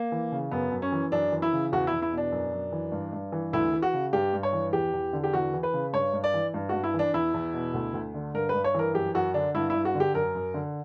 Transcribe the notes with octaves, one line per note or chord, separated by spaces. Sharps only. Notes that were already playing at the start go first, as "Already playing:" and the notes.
Already playing: A#3
E3
C#3
F#2 B3
F#2
C#4
E3
F#2 D4
E3
E4
C#3
E2 F#4
E2 E4
E4
B2 D4
F#2
F#2
E3
G2
G2
E3
D2 E4
E3
F#4
C#3
G2 G4
G2
C#5
E3
E2 G4
E2
D3
G4
E2 F#4
E3
B4
C#3
G2 C#5
G2
D5
E3
G2
G2 F#4
E4
E3
D4
E2 E4
E2
B2
D2
D2
D3
G2 A#4
B4
G2
C#5
E3 A#4
F#2 G4
F#2 F#4
D3 D4
G2 E4
G2 E4
F#4
D3
G4
F#2 A#4
F#2
D3